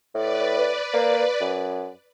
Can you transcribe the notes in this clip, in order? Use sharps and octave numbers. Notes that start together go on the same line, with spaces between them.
A2 B4 D5
A#3
F#2